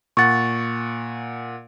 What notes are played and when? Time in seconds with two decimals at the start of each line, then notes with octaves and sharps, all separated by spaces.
0.17 A#2 F#5 C#6 A6